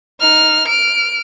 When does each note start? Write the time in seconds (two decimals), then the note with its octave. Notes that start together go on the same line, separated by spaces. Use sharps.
0.20 D#4 F6
0.68 F6 D7